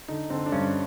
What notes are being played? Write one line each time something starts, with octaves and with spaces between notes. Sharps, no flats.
D3 D#4
D3 C4
D4
G2 C#4